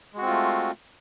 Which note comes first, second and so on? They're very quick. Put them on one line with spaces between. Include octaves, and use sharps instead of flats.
G#3 F#4 C4 F4 A3